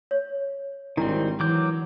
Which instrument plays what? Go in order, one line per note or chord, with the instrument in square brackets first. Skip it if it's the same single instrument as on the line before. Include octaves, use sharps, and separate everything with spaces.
[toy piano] C#5
[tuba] G#1 [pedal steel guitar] D#3 G3 C4 [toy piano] D4 E4 A#5
[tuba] E3 [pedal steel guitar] F#3 D6 G6